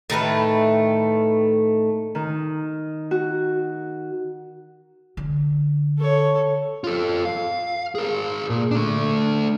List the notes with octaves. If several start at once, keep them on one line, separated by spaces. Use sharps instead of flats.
A2 D#3 A3 B4
D#3
F#4
D3
A4 C#5
F4 A4
F5
G#4 A#4
A#2
A3 D4